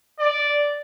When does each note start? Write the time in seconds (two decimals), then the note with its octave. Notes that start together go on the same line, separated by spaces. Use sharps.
0.19 D5